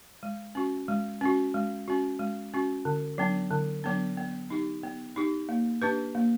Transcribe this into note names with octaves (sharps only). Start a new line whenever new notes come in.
G#3
C#4 F#4
G#3
C#4 F#4
G#3
C#4 F#4
G#3
C#4 F#4
D3
F#3 B3 D4
D3
F#3 B3 D4
B3
D#4 G4
B3
D#4 G4
A#3
D4 G4 B4
A#3